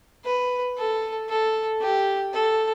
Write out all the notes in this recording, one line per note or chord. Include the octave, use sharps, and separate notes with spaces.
B4
A4
A4
G4
A4